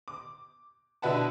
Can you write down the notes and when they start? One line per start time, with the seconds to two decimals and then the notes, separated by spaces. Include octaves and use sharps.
0.08 D6
1.02 B2 D3 E4 B4 F#5 A5